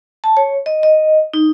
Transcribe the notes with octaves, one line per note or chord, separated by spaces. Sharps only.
A5
C#5
D#5
D#5
D#4